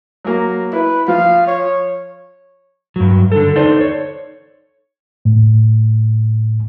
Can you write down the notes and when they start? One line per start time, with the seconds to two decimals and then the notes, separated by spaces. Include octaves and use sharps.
0.24 F#3 A#3
0.73 E4 B4
1.08 F3 F5
1.47 C#5
2.96 G2 F#3
3.32 D3 A4
3.56 D#4 A4 C5 D5
3.81 C#5
5.25 A2